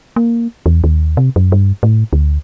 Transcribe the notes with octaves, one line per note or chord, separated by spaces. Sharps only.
A#3
E2
D#2
C3
F#2
G2
A2
D2